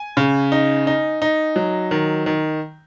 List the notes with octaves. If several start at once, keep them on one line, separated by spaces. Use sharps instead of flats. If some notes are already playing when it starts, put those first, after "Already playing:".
Already playing: G#5
C#3
D#4
D#4
D#4
F#3
D#3
D#3